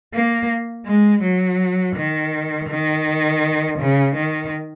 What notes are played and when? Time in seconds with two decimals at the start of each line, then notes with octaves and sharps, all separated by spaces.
0.14 A#3
0.86 G#3
1.23 F#3
1.96 D#3
2.69 D#3
3.79 C#3
4.16 D#3